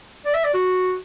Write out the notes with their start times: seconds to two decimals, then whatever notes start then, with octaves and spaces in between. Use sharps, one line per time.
0.25 D5
0.34 E5
0.45 D5
0.54 F#4